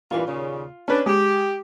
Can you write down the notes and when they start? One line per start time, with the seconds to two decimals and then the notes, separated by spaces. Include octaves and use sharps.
0.11 G2 A#2 E3 F4
0.26 D#2 A#2 C#3
0.88 C#4 D4 B4
1.06 G#3 G4